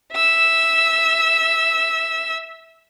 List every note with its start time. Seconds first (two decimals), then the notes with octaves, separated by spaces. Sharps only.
0.13 E5 E6